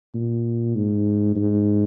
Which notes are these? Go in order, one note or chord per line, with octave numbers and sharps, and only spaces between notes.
A#2
G#2
G#2